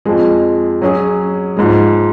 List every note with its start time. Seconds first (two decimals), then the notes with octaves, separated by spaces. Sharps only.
0.05 F2 F3 G#3
0.82 F#3 C#4 G#4
1.57 G#2 F3 G#3